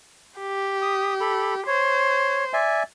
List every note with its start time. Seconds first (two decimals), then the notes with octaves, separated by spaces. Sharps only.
0.39 G4
0.82 D#6
1.21 A4 B5
1.67 C5 C#5
2.53 D5 E5 G#5